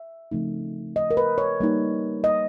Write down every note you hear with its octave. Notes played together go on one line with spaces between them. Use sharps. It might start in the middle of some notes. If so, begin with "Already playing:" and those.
Already playing: E5
C#3 F3 A3 C4 D#4
D#5
A#4
B4
C#5
G3 A#3 D#4
D#5